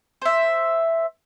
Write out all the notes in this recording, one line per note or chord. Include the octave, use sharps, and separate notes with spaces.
C5 E5